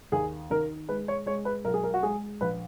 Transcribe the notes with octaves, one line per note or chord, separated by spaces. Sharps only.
D#2 G#4
D#3 A#4
G#3 B4
C#5
G#3 C#5
B4
B1 A#4
G#4
A#4
F#4
G#3 G#4
A#1 B4